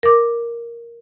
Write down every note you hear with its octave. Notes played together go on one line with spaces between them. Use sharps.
A#4 D6